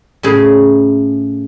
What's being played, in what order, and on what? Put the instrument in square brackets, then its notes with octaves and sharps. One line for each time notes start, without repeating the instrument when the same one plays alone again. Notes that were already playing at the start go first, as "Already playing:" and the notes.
[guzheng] A2 C#3 G#4